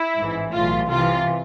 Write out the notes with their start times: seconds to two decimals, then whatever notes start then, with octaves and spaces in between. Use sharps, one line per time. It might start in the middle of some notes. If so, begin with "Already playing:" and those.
Already playing: E4
0.16 A1 G#2 E3
0.53 B1 A2 E3 F4
0.90 C2 C3 E3 F4